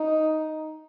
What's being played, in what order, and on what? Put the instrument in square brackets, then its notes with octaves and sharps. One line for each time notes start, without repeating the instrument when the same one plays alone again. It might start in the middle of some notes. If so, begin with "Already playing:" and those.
Already playing: [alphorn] D#4